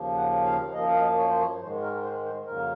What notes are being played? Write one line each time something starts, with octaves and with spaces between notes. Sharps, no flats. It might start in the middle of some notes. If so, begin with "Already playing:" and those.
Already playing: D#2 C#3 F3 A#3
F#5
F5
F#2 F3 A#3 D#5
F5
D#5
C#5
C5
C#5
G#2 D#3 G#3 C5
A#4
C5
C5
F2 C#3 F#3 A#3 A#4